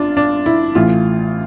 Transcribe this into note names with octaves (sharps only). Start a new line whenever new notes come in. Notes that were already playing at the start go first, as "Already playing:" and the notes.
Already playing: G1 D4 F4
D4
E4
A1 A2 E3 F4